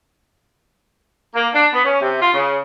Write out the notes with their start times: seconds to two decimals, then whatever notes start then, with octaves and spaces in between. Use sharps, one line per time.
1.34 A#3
1.53 D4
1.73 B3
1.85 C#4
2.01 C3
2.21 F4
2.33 C#3